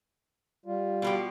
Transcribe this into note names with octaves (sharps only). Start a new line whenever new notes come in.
G3 F4
B2 F3 G4